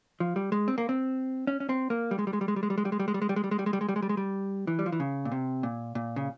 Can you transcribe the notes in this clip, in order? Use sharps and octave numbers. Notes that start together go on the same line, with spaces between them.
F3
G3
G#3
C4
A#3
C4
C#4
C#4
C4
A#3
G3
G#3
G3
G#3
G3
G#3
G3
G#3
G3
G#3
G3
G#3
G3
G#3
G3
G#3
G3
G#3
G3
G#3
G3
G#3
G3
G#3
G3
G#3
G3
G#3
G3
E3
G3
F3
E3
C#3
A#2
C3
A#2
A#2
C#3